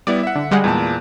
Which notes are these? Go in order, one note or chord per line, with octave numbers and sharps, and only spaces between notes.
G3 B3 E4 D5
E5 F#5
D3
G3 G#3 F#5
E2 A#2 A5